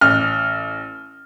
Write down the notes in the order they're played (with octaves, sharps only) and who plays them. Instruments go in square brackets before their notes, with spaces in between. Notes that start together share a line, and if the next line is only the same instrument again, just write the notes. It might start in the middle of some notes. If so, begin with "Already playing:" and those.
[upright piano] A1 F6